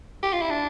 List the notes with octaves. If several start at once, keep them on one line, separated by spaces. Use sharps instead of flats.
G4
F4
E4
D4